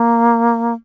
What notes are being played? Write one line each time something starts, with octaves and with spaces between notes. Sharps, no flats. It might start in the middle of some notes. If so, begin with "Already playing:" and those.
Already playing: A#3